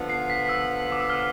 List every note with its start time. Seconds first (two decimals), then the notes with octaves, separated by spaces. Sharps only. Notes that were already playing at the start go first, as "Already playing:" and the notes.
Already playing: D3 F3 B3
0.10 C7
0.30 B6
0.49 E6
0.92 D6
1.00 E6
1.10 F6